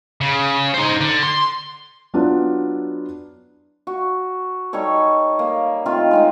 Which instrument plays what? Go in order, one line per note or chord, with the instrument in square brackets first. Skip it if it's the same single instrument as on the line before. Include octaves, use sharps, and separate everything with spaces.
[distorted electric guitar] C#3
D#4 C5
D3
C6
[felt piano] F#3 B3 D4 E4 F4
[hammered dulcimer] F#4
G3 D#4 A4 C#5
A#3
D#3 A3 C4 F4
G#3 C4 D#4